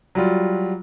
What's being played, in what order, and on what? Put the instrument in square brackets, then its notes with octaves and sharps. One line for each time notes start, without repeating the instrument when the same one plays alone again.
[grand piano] F#3 G3 F4